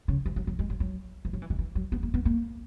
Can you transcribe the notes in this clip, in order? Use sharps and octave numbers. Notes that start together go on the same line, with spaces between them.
C#3
E3
F#3
F#3
G#3
F#3
F#3
E3
F#3
E3
D#3
E3
F#3
B3
A#3
B3
A#3